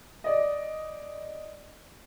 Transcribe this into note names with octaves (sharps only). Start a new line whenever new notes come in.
D5 D#5